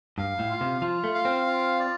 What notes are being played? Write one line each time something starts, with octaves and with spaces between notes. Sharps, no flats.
G2 F5
A2
F4
C3
F3 F4
A3
F5
C4
F4
D5